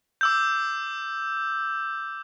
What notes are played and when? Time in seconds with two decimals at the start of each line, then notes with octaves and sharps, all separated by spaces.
0.21 D6 E6 G6